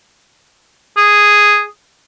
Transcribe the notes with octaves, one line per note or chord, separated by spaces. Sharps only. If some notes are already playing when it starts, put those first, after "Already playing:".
G#4